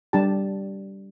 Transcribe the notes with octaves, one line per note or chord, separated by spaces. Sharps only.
G3 D4 G4 A5